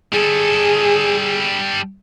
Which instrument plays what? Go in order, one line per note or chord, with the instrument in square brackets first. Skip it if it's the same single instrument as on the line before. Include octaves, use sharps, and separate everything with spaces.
[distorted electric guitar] G3 A4 [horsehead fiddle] G#4